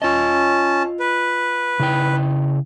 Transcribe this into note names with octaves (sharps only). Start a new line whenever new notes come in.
C#4 F4 D#5 A5
B4
C#3 E4 G5